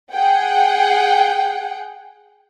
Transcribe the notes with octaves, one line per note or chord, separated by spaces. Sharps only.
G#4 F#5 G5